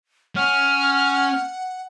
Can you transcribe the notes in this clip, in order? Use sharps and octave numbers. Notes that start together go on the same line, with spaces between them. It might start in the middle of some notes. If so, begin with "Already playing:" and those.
C#4 F#5 F6